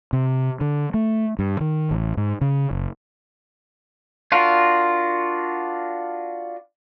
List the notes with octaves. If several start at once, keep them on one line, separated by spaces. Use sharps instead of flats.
C3
D3
A3
G2
D#3
A1
G#2
C#3
F#1
D4 F4 F#4 A#4